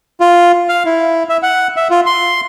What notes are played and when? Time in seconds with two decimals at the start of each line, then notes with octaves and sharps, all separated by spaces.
0.20 F4
0.69 F5
0.86 E4
1.29 E5
1.43 F#5
1.76 E5
1.91 F4
2.06 C6